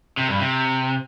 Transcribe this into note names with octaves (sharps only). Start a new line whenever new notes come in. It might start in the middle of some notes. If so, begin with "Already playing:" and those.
C3
G2
C3